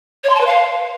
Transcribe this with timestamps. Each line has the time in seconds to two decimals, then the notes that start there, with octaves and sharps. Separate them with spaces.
0.24 C#5
0.29 C6
0.35 A5
0.40 B4
0.46 F5